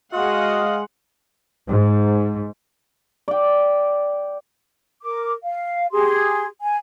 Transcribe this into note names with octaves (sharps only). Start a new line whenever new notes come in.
G#3 F#4 D#5 F5 F#5 G#5 C6
G#2
D5 G5
A#4 D6
F5
G4 G#4 C6
G#5